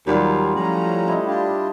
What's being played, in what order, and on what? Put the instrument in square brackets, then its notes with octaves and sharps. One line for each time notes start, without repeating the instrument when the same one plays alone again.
[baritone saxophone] D#2 [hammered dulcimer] F#3 G3 F4
[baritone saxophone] A2 [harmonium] F3 C#4 A#5
[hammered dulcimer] E4 D#5
[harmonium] D4 F4 G4